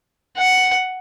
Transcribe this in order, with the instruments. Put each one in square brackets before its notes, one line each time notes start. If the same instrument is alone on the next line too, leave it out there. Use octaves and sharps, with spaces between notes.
[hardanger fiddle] F#5